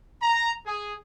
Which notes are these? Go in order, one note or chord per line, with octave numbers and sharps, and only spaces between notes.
A#5
G#4